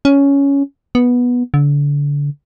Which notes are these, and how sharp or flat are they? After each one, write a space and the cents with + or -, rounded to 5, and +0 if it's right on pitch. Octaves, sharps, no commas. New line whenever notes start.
C#4 +10
B3 -10
D3 -30